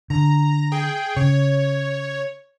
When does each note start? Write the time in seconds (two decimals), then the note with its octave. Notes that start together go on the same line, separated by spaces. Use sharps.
0.10 D3 A#5
0.72 G#4 G5
1.16 C#3 C#5